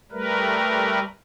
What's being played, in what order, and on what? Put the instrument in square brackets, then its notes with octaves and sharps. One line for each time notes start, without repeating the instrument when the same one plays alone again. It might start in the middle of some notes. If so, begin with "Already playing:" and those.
[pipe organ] G3 A3 A#4 B4